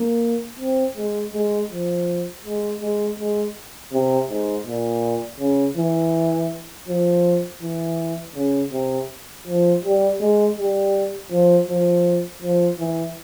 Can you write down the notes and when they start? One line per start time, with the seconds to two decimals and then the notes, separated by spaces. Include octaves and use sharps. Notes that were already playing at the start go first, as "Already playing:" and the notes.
Already playing: A#3
0.59 C4
0.97 G#3
1.33 G#3
1.71 F3
2.45 G#3
2.81 G#3
3.19 G#3
3.92 C3
4.30 G#2
4.67 A#2
5.40 C#3
5.77 E3
6.88 F3
7.62 E3
8.36 C#3
8.72 C3
9.47 F3
9.84 G3
10.20 G#3
10.58 G3
11.32 F3
11.68 F3
12.42 F3
12.79 E3